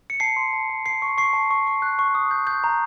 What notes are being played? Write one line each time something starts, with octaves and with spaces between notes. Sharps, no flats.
C#7
A5 C7
C6
A5
A5
A5 C7
C#6
C#6 C7
A5
C#6
C#6
F#6
C#6
D#6
G6
G6
A#5